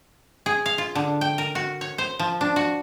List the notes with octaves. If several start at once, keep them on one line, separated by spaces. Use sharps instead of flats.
G#4
F5
F4
D3
G5
A#4
F#4
C#5
C5
F3
D4
F#4